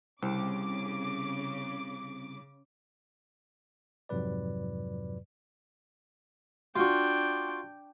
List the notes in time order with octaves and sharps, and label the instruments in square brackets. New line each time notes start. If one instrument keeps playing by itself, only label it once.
[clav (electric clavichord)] C2 [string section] C#3 D6 [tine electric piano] C4
[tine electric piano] F2 G#2 C3 F#3 B4 D5
[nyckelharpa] D4 G5 [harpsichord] F4 F#4